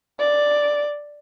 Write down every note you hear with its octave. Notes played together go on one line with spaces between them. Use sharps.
D5